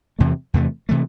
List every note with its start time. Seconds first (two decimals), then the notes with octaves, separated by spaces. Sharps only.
0.19 E2 C3 E3 A3
0.54 E2 C3 E3 A3
0.89 C3 E3 A3